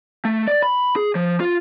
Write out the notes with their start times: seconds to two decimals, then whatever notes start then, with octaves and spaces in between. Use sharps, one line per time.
0.25 A3
0.47 D5
0.62 B5
0.96 G#4
1.15 F3
1.40 F4